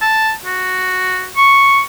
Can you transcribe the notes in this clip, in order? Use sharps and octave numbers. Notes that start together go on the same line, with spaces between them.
A5
F#4
C#6